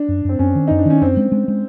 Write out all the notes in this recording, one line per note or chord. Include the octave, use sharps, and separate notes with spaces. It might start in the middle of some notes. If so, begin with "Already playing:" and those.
Already playing: D4
F#2
F#2 C4
F#2 C#4
D#3
F#2 D#4
D4
D#3 C#4
F#2 C4
G#3
G#3
G#3